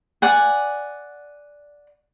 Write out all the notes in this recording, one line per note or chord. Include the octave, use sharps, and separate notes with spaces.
D5 F#5 G#5